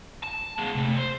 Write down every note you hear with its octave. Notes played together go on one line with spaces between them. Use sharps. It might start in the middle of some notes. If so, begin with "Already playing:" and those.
A5
G#3 B3
C3 A3
C5